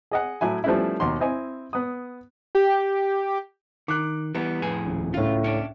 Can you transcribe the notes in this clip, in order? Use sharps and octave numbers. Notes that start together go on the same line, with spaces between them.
G#4 D#5 F#5
A2 F#3 E4 G#5
F3 G3 A3 B3 C#4 E4
D#2 B2 D#4 C6
C4 E4 D#5 G#5
B3 D#6
G4
D#3 D6 F#6
E3 G3 B3 B4
F2 A2 G#4
D#1
C#2 A2 F4
C#4 D4